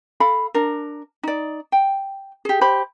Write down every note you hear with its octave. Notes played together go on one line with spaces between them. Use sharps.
A4 F5 B5
D4 A#4
D#4 D5
G5
G4 G#4
G4 C5 B5